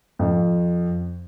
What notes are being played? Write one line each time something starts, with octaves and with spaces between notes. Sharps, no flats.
F2